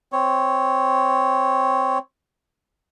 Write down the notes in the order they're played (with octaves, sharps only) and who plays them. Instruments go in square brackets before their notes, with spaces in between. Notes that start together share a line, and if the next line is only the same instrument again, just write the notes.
[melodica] C4 C#5